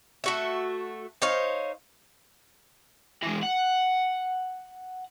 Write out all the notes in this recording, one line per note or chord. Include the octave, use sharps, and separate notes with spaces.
A3 F#4 E5
D#4 C5 C#5 F5
E3 G#3
F#5